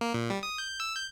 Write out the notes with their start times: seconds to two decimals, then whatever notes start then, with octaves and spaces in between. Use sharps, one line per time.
0.01 A#3
0.14 A#2
0.30 G3
0.43 D#6
0.58 G6
0.80 E6
0.95 G6